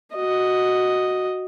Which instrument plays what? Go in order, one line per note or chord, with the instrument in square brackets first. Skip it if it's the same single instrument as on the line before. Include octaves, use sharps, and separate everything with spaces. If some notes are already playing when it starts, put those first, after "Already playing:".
[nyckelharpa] F#4 D#5